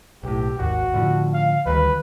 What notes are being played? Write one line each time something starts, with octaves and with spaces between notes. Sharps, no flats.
B1 A2 G4
G#1 D#2 F#4
A2 D3 F3
F5
D2 D#3 G3 B4